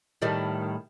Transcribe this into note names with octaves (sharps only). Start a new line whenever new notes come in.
A2 D#3 G3